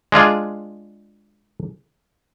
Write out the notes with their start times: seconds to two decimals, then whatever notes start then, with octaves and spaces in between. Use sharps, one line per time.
0.12 G#3 D4 F4 G#4